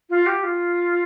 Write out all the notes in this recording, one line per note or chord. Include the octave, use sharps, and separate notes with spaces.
F4
G4
F4